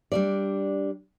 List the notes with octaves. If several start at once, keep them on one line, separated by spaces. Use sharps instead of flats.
G3 D4 D5